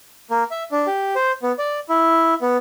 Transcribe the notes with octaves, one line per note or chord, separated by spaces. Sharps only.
A#3
E5
D4
G4
C5
B3
D5
E4
B3